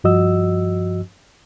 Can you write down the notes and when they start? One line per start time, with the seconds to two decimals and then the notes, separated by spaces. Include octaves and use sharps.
0.04 G2 F3 F#4 D#5 E6